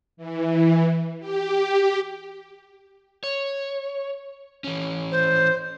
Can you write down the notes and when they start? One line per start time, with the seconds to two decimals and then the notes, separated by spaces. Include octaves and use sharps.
0.17 E3
1.20 G4
3.23 C#5
4.64 E3 C#4
5.11 C5